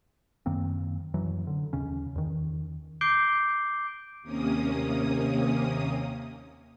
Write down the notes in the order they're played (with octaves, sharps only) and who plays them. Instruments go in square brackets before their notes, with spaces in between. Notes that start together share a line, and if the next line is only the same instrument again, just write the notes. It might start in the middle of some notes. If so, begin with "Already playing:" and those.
[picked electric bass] F#2 D#3 A#3 C4
F#2 E3 F#3
D3
D#2 C#3 C#4
E2 D#3
[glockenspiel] D6 G6 C7 D7 G7
[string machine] D#2 C3 A#3 C#4 D#6